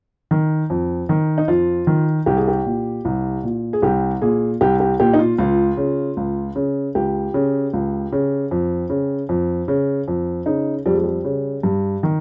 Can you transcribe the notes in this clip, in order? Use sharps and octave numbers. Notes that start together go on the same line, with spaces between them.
D#3
F2
D#3
D#4
F2 F4
D#3
C2 G4
G#4
G4
A#2
C2
A#2
G#4
C2 G4
A#2 G#4
C2 G4
G4
A#2 G4
D#4
F4
C#2 F4
C#3
C#2
C#3
C#2 G4
C#3
C#2
C#3
F2
C#3
F2
C#3
F2
C#3 D#4
F2 G3
G#3
G3
C#3
G2
D#3